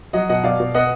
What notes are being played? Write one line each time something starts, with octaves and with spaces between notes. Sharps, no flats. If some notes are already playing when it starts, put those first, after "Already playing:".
F#3 D#5 F#5
B2 D#5 F#5
B2 D5 F5
B2
B3 D#5 F#5